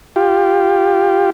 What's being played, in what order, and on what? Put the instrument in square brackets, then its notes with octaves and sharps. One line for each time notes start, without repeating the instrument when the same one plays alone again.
[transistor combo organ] F4 G4